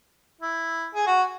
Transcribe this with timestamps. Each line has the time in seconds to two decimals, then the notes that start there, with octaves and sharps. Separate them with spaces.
0.41 E4
0.95 G#4
1.07 F#4